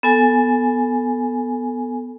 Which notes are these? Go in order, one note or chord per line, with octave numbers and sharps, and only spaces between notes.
B3 A4 G#5